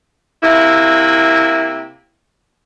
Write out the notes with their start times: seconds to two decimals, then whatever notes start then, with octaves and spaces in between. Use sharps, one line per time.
0.42 C3 A#3 E4